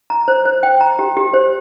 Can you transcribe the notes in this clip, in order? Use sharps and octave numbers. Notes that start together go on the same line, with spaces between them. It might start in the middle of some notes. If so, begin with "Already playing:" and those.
A#5
C5
C5
G5
A#5
G4
G4
C5